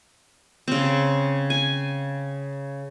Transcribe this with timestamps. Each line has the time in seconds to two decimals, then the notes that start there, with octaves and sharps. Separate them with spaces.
0.68 C#3 C4
1.50 G#5